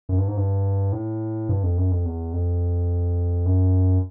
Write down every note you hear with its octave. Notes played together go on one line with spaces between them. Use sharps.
F#2
G2
G#2
G2
A2
G2
F2
F#2
F2
E2
F2
F#2